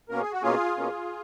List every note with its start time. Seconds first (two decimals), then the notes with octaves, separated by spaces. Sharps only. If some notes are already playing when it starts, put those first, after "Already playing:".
0.09 B2 A#3 C#4 A#4
0.21 G#4
0.32 F#4
0.42 B2 A#3 C#4 F4 G#4
0.77 B2 A#3 C#4